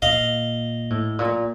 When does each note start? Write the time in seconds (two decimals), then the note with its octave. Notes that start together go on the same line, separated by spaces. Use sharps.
0.02 A#2 D#5 F5
0.90 A2
1.19 A#2